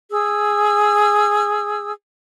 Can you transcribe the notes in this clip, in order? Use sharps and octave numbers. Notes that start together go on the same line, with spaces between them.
G#4 E6